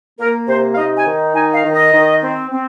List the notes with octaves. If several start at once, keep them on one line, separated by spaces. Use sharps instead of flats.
A#3 A#4
C3 C5
F5
D#4 D#5
G#5
D#3
D#4 G#5
F5
D#3
D#5
D#3
C4
C4